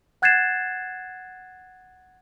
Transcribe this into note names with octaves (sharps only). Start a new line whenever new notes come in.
F#5 F#6 G#6 A6 C7 E7